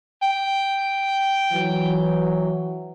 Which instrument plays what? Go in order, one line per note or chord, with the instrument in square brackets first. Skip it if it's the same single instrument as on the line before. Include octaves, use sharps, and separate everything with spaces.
[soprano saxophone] G5
[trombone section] E3 F#3